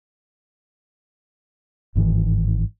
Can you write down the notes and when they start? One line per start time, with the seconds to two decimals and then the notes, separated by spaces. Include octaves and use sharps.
1.95 G1 G#2 D#3 E3